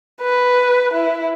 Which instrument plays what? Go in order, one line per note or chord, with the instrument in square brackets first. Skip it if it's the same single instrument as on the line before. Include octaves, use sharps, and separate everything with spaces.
[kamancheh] B4
E4